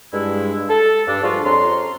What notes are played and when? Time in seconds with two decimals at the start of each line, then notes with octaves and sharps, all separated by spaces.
0.13 G2 G#3 E4
0.69 A4
1.07 G2 D4
1.22 F3 G3 G#3 D4 F4 F#4
1.44 F2 C#4 A4 A#5 C6